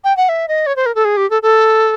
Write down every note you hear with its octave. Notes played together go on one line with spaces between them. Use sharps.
G5
F#5
E5
D#5
C#5
C5
A#4
A4
G#4
G4
A4
A4